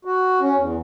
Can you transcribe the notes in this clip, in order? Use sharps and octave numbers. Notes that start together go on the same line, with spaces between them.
F#4
C#4
E2